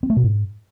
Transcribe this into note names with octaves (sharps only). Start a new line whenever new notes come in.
C4
A3
B2
G#2